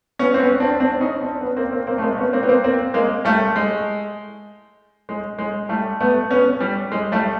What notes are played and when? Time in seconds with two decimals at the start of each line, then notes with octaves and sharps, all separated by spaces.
0.19 B3 C#4
0.34 C4
0.40 B3 C#4
0.60 C4 D4
0.80 C4 D4
1.00 C#4 D#4
1.22 C4 D4
1.41 B3 C#4
1.57 A#3 C4
1.72 A#3 C4
1.87 A#3 C4
1.98 A3
2.02 G#3 A#3
2.17 B3 C#4
2.33 A#3 C4
2.43 B3
2.48 A#3 C4
2.64 A#3 C4
2.94 G#3 A#3
3.25 G3 A3
3.56 G#3
5.09 G#3
5.38 G#3
5.69 G3 A3
6.00 A3 B3
6.31 B3 C#4
6.60 G3
6.92 G#3
7.12 G3 A3